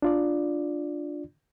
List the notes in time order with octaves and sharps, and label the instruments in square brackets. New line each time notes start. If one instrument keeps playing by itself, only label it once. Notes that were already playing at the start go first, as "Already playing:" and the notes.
[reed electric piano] D4 F4 D5